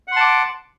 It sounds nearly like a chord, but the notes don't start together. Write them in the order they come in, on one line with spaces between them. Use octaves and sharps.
F#5 C6 A5 D6